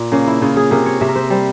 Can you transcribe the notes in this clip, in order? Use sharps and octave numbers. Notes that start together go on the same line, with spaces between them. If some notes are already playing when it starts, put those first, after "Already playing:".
Already playing: A#2
C#3 A#3
E4
C#3 F4
G#4
C3 A#4
C#5
C3 E5
A#4
C5
G3 C5